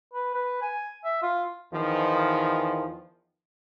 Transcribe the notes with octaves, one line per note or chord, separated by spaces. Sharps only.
B4
B4
G#5
E5
F4
E2 D#3 F3